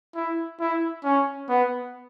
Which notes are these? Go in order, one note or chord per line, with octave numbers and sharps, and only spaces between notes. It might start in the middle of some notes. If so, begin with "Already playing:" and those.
E4
E4
C#4
B3